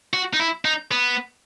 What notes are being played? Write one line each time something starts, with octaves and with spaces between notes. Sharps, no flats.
F#4
D#4
E4
D#4
B3